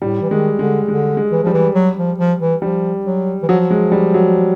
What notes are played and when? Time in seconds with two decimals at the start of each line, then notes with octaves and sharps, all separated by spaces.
0.01 A2 G3
0.21 E3
0.30 D#3 G#3
0.59 D3 G#3
0.88 D3 G#3
1.17 G#3
1.32 E3
1.43 F3 G3
1.53 E3
1.75 F#3
1.97 F3
2.18 F3
2.40 E3
2.62 F3 G3
3.06 F#3
3.43 E3
3.48 F3 F#3
3.71 G#3
3.92 G3
4.14 F#3